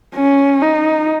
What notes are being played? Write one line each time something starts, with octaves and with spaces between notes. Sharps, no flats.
C#4
D#4